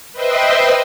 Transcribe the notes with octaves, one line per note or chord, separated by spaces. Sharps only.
B4 C5 D#5 E5 G5 C6